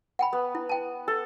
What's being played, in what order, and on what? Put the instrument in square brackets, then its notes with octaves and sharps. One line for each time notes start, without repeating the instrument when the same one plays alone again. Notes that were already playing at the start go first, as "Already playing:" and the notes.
[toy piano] F#5 G5 B5
[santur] B3
[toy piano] E4
G5 A5
[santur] A4